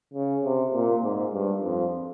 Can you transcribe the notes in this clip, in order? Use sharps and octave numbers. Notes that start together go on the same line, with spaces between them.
C#3
C3
A#2
G#2
G2
F2